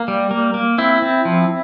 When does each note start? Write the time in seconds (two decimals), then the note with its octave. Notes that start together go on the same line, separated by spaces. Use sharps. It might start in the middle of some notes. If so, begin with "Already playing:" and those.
Already playing: A#3
0.08 G3
0.31 A#3
0.54 A#3
0.78 C4 E4
1.02 C4
1.25 F3